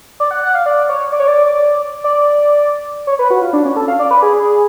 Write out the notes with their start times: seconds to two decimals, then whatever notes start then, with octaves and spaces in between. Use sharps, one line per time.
0.20 D5
0.31 F#5
0.43 F#5
0.54 F5
0.66 D5
0.89 C#5
1.12 D5
1.20 C#5
1.28 D5
2.04 D5
3.07 C#5
3.19 B4
3.30 F#4
3.42 F4
3.53 D4
3.65 C#4
3.76 A4
3.88 F5
4.00 D5
4.11 B4
4.22 G#4